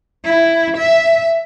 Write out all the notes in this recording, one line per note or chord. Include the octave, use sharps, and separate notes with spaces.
E4
E5